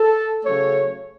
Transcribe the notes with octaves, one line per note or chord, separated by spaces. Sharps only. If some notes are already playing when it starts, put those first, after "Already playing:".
Already playing: A4
C#3 F#3 A3 C#5